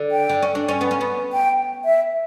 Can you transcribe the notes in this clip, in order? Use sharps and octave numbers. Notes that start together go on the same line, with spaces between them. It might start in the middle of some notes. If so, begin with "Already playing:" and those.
Already playing: D3
G5
D3
C#4
D4
C#4
B3
C#4
B3
G5
E5